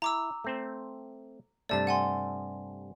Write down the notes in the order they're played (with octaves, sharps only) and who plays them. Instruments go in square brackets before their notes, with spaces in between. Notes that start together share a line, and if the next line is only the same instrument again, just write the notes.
[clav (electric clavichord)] E4 [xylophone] A#5 D6 E6
[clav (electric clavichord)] A3 C4 C5
[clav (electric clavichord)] G2 C3 A3 [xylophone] D5 A5 A6
[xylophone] F#5 G#5 C6